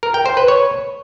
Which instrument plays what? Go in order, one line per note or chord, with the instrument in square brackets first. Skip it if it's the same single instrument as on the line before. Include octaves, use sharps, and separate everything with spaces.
[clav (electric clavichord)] A#4
G5
C5
B4
C#5